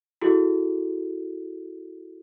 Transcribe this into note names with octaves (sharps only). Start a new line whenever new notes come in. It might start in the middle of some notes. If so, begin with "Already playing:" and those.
E4 F#4 G#4 A4